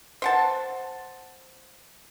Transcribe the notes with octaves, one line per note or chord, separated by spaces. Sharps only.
C5 F#5 A5